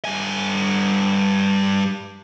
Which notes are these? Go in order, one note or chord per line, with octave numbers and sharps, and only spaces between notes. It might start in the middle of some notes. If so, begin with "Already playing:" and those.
G2 G#5